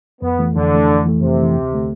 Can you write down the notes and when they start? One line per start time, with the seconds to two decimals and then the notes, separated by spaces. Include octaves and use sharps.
0.22 F2 B3
0.39 E3 A3
0.55 F2 D3
0.71 E3 A3
0.88 F2
1.06 E3 A3
1.21 F2 C3
1.38 E3 A3
1.56 D2
1.72 D3 A3